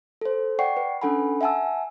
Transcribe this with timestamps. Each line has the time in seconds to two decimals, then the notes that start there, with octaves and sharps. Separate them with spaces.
0.21 A4 C5
0.59 D5 F#5 G5 C#6 C7
0.77 B4
1.02 C#4 D4 A4 F#5 G#5 B5
1.41 E5 F#5 G#5 A5 E6